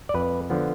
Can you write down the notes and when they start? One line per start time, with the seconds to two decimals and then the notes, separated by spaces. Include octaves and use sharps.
0.09 D5
0.14 F2 B4
0.50 D3 F3 B3